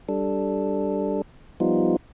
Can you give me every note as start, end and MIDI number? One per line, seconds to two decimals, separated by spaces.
0.09 1.22 55
0.09 1.22 62
0.09 1.22 69
1.60 1.96 53
1.60 1.96 55
1.60 1.96 59
1.60 1.96 63
1.60 1.96 65